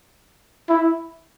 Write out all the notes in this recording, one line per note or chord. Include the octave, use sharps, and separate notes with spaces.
E4